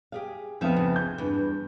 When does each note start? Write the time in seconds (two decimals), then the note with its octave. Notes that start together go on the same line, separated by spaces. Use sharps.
0.12 G4 G#4 F5
0.61 F2 B3 D#4 E5 F5
0.76 C#3
0.96 G6
1.18 E2 G2